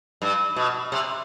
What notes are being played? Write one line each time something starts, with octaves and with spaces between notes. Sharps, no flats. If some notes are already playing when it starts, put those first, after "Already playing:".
G2
B2
C3